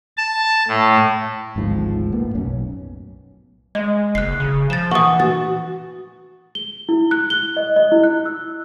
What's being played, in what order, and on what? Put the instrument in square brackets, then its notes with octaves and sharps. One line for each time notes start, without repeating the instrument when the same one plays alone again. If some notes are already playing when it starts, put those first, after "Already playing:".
[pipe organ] A5
A2
[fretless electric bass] G#1 D2 G#2 F3
A2 A#3 B3
B1 F#2 C#4
[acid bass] G#3 [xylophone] D#5
[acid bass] F#1 [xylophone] F#6 C7
[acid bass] C#3
[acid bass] F3 [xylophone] A6 E7
[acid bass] E3 [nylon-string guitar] F#5 [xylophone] C#6 D#6
[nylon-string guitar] F#4 [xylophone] A6
[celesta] G7
E4
F#6
G7
D#5
D#5
E4
F#6
E6